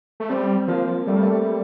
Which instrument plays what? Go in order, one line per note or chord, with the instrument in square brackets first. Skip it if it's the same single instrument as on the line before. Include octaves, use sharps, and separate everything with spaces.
[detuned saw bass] A3
[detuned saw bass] G3 [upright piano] C4
[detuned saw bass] F3 [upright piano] A#3
[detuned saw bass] G3 [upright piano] A3
[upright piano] A#3
A3